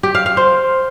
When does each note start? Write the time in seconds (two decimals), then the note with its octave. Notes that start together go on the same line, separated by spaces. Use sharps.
0.03 G4
0.15 F5
0.26 F5
0.37 C5